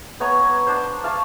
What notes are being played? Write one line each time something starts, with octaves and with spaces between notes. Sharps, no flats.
B3 C#5 G#5 A#5
D4 C5
F5 A5 C#6